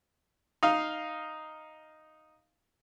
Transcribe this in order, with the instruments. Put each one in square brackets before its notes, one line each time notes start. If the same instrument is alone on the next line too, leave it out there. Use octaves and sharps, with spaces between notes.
[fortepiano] D#4 F5